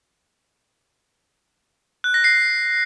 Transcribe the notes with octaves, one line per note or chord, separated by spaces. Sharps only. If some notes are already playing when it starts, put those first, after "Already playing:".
F#6
A#6
C7